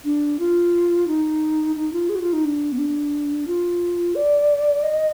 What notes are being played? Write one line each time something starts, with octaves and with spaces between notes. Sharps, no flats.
D4
F4
D#4
D#4
F4
G#4
F#4
F4
D#4
D4
B3
D4
F4
D5
D#5